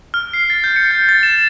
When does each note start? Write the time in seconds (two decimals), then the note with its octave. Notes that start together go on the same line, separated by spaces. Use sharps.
0.14 F6
0.33 C7
0.50 A6
0.64 G6
0.76 C#7
0.91 G6
1.09 A6
1.23 E7
1.35 E7